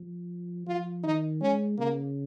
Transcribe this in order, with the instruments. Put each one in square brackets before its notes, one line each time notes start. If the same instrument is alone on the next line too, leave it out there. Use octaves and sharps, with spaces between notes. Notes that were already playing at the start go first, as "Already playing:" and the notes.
Already playing: [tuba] F3
[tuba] F3 [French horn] F4
[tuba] D#3 [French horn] D#4
[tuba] G#3 [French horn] C#4
[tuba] C#3 [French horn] A#3